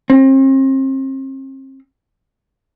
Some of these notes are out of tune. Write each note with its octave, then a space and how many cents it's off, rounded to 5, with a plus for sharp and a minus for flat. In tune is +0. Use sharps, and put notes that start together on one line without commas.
C4 +40